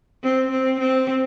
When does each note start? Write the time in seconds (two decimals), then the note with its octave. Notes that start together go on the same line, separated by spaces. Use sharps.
0.23 C4
0.51 C4
0.80 C4